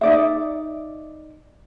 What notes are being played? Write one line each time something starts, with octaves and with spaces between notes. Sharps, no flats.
D#4 D5 E5